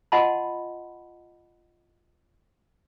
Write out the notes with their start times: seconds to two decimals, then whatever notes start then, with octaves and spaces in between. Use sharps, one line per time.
0.12 F4 D#5 F#5 A5 B5 C6